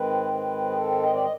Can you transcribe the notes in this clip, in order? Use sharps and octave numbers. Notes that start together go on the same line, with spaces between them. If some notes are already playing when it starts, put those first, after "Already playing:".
Already playing: G#2 D#3 G#3 C4 B4
B4
G#4
A4
D#5
D5
D#5